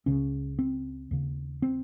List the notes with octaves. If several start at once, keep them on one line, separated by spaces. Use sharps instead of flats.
C#2 C#3 C#4
C4
D#2 C#3
C4